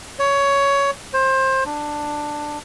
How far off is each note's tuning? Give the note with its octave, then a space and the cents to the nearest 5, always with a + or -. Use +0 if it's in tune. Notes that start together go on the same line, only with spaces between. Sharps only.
C#5 +15
C5 +25
D4 +10